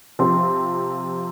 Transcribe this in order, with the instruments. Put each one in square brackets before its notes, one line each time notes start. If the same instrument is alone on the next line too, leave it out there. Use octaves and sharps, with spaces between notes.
[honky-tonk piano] C3 F3 C4 [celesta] C6